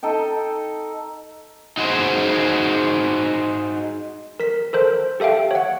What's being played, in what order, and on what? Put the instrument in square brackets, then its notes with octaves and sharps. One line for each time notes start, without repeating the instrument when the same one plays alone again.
[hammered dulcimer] D#4 A4 D#5 G5
[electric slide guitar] D#4 F#4 G#4 C5
[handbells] A#4 B6
A4 A#4 C5
G4 A4 E5 F5 G5
C#5 F#5